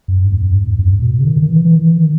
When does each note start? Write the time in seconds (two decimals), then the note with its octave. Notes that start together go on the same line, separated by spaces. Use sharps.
0.08 F#2
0.24 G#2
0.32 E2
0.40 F#2
0.55 G#2
0.67 E2
0.79 F#2
0.91 G#2
1.02 B2
1.20 C#3
1.26 D#3
1.42 D#3
1.49 E3
1.65 E3
1.76 D#3
1.81 E3
1.97 D#3